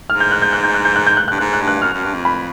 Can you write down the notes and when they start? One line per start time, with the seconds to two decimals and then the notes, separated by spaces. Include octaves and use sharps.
0.09 G#2 F6
0.20 G6
0.31 F#6
0.42 G6
0.53 F#6
0.64 G6
0.74 F#6
0.85 G6
0.96 F#6
1.07 G6
1.17 F#6
1.28 F#6
1.31 G2
1.38 G#2 F#6
1.53 F#6
1.61 G2
1.67 F#6
1.82 F#2 F6
1.93 F#2
2.04 G2
2.14 F2
2.25 B5